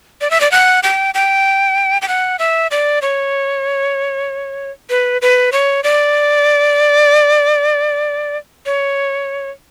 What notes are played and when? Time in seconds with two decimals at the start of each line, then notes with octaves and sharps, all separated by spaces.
0.21 D5
0.31 E5
0.41 D5
0.52 F#5
0.83 G5
1.14 G5
2.02 G5
2.08 F#5
2.39 E5
2.71 D5
3.02 C#5
4.90 B4
5.22 B4
5.52 C#5
5.84 D5
8.66 C#5